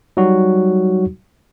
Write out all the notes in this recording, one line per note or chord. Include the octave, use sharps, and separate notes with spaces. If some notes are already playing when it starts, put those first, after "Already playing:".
F#3 G3 D#4 F#4